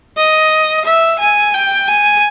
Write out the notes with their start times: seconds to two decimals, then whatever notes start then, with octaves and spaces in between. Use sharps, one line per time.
0.17 D#5
0.85 E5
1.19 G#5
1.54 G5
1.88 G#5